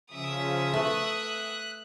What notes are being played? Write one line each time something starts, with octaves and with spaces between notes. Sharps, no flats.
C#3 F3 C#4 E5 D#6
A3 B4 F#6